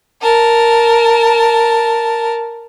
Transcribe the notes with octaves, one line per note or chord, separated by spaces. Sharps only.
A#4 A5